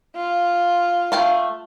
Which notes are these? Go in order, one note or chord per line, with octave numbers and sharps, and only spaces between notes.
F4
A3 F5 G5